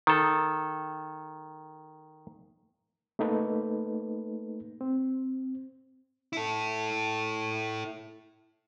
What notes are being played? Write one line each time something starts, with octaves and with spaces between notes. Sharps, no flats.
D#3 A4
A3 A#3 D#4 A4 B4
C4
E4 A4